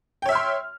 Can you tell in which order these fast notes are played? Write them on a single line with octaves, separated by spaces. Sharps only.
G5 C#5 E5 F6 C6